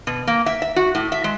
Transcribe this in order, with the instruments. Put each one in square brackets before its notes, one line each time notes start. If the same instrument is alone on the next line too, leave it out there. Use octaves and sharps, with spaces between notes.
[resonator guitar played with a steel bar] B2
A#3
E5
E5
F#4
A2
E5
G#3